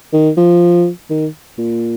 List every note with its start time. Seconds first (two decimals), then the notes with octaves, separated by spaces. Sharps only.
0.13 D#3
0.37 F3
1.10 D#3
1.58 A#2